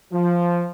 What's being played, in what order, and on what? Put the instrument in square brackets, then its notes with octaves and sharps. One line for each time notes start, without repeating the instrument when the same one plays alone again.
[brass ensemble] F3